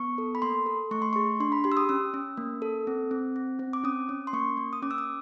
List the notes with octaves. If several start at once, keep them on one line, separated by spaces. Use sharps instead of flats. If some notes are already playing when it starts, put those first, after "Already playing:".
Already playing: B3 C#6
A4
B5
A#3 C6
A4
A3 C#6
C6
G#4 C#6
D4 C6
B5
G4 C6
E6
D#6
C#4 E6
C#4
A#3
A4
C4
C4
C4
C4
D6
C#4 D#6
C#4
C6
A#3 C#6
A#3
D#6
C#4 D6
E6
D#6